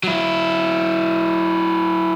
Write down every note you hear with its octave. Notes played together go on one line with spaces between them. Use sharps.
F#3 E4